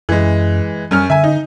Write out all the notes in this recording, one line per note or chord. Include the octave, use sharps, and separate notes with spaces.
F#2 E3 G#3
F#2 G3 C#4 F6
D3 E5 G#5
D#4